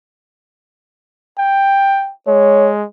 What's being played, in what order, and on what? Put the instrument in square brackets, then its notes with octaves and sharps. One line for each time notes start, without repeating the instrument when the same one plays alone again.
[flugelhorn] G5
[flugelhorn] G#3 [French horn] C#5